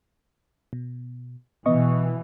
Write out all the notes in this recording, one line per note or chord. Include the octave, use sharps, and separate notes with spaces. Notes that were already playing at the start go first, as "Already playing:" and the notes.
B2
B2 E3 B3 D#5 C#6